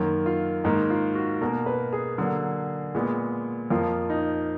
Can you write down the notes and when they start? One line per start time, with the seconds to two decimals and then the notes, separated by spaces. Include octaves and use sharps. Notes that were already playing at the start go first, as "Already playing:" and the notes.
Already playing: F#2 D#3 A#3
0.26 F4
0.64 G#2 D#3 A#3 D#4
0.90 F4
1.15 F#4
1.41 B2 A#3 A#4
1.66 B4
1.93 G#4
2.18 D3 F#3 A#3
2.95 A#2 G#3 B3
3.70 F2 F3 A#3 F4
4.10 D#4